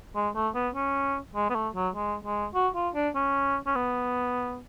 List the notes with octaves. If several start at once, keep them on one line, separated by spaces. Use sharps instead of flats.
G#3
A3
B3
C#4
G#3
B3
A3
F#3
G#3
G#3
F#4
F4
D4
C#4
C#4
B3